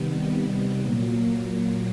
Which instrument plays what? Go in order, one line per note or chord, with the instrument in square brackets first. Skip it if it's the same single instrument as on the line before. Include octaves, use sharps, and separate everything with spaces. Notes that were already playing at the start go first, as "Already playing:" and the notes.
Already playing: [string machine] C3 D#3 G3 B3
A#2 F#3 A#3